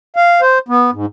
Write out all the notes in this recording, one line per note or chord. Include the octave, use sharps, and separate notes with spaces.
F5
C5
B3
G#2